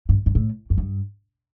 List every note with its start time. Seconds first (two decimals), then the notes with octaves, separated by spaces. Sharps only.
0.09 G2
0.26 G2
0.35 A2
0.70 F#2
0.78 G2